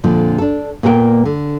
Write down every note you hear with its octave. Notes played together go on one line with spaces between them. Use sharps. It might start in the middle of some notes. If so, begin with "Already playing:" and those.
F2 A#2 D3 F3
D4 A4
A#2 A#3 B3 G#4 A#4 G5
D3